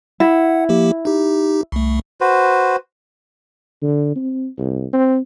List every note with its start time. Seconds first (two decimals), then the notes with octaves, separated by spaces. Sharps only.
0.20 E4 F#5
0.69 F3 A#3 G4
1.05 D#4 G4
1.72 C2 A3
2.21 F#4 B4 C5
3.82 D3
4.16 C4
4.58 C2
4.93 C4